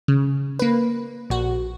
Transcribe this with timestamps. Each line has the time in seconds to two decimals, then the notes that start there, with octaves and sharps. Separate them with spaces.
0.08 C#3
0.59 A#3 B4
1.30 A#1 F#4